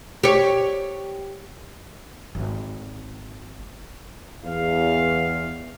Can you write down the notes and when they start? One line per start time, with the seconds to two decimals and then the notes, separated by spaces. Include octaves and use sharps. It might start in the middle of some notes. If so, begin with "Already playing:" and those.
0.24 G4 C#5
2.35 G#1
4.44 E2 F5